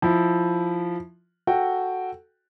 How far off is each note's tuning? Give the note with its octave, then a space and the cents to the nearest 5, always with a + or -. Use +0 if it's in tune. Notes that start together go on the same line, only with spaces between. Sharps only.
F3 +0 E4 +0
F#4 +0 A4 +0 G5 +0